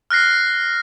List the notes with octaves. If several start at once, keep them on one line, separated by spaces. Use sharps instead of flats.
F6 F#6 A#6 C7